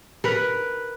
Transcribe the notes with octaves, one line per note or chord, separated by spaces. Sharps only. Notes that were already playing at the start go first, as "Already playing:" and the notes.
A#4 B4